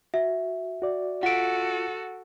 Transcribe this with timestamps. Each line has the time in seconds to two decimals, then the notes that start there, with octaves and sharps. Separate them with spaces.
0.14 F#4 E5
0.82 F#4 D5
1.23 F4 F#4 A4 F#5 D7